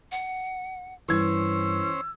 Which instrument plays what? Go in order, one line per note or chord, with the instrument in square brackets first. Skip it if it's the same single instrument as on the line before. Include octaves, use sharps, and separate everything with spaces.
[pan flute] F#5
[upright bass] G2 [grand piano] E3 G#6 [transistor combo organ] C#4 C5 [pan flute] E6